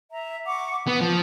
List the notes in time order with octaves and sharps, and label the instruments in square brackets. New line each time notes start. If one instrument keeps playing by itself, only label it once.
[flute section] E5 A#5
F#5 C#6 D6
[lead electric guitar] B3 [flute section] D#6
[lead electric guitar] F3